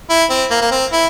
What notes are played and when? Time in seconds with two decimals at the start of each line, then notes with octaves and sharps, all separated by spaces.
0.10 E4
0.30 C4
0.51 A#3
0.61 A#3
0.71 C4
0.92 E4